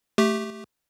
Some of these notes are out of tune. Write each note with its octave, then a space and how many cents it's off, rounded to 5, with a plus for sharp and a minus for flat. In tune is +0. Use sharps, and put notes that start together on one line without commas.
A3 +0 G4 +0